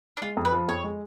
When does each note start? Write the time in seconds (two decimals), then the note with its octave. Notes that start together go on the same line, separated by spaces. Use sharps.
0.17 D4
0.22 G#3 F4
0.37 F2
0.45 B4
0.52 F3
0.68 F2 C#5
0.84 G#3